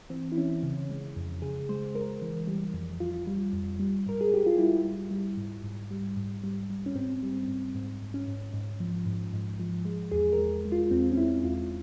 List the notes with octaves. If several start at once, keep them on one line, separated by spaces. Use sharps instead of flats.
E3 C4
E4
E3 C#4
C#3 C#4
G#3
F2
C#3 G#4
G#3 C5
G#3 A#4
E3
G3
F2
F2 F4
G3
F2
G3
G#2 A#4
G#4
G#2 G4
F4
G3 E4
G3
G3
G#2
G#2
G3
G#2
G3
G3
C#4
G#2 C4
G3
G#2
G#2
G#2
C#4
G#2
G#2
F3
G#2
G#2
F3
G#3
E2 G#4
A#4
G#3
G#3
F4
E2 C4
C#4
G#3 E4
E2 F4